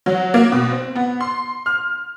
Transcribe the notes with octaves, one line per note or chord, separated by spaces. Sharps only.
F#3
A#3
B2
C4
B3
C6
F6